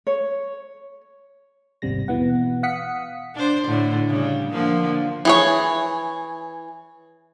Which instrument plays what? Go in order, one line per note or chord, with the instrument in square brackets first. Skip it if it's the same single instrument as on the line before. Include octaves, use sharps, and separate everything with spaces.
[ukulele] C#5
[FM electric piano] G#1 D#2 C3 G3 A#6
B2 E3 B3 F#5
F5 F#5 D#6 B6 C#7
[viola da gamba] D4 C5
A2 D3
C#3 G3
D3 F3 A#3
[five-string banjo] E3 G#4 C#5